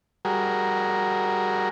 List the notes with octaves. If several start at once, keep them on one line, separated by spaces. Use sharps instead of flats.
G3 F#4 G#4 A#4